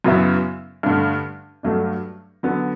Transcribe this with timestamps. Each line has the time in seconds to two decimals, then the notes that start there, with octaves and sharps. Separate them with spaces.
0.04 F#2 C#3 F#3 B3 E4
0.83 G2 D3 A3
1.63 G2 F#3 A3 D4
2.43 D3 F#3 B3